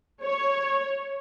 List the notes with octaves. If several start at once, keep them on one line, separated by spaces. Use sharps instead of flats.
C#5